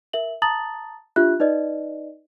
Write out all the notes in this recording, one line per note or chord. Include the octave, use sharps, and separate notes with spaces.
A#4 E5 F#7
A5 A#5 D#6 A6 F#7
D4 F4 G4 E5 F#6
D#4 B4 D5 D#5